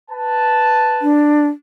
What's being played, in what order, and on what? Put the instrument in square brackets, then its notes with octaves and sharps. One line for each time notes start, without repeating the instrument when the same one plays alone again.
[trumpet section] B4 A5
[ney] D4